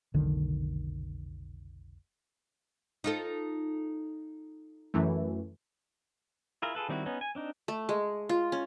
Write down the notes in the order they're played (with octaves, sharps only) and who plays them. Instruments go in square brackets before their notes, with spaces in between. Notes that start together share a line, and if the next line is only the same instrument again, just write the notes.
[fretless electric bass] F1 B1 D3 D#3
[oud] D#4 F4 A4
[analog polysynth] F#2 E3 A3
[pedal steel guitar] E4 F4 G#4 A#4
F4 G#4 A4 B4
D#3 G3 C4 E4 F#4
B3 C#4 D#4
G#5
C4 D4 D#4
[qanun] A3
G#3
F4
C#4